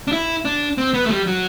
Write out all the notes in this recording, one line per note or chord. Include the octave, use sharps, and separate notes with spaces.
D4
E4
D4
C4
B3
A3
G3
F#3